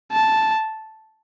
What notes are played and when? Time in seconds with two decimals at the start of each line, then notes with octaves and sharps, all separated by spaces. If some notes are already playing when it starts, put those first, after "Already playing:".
0.12 A5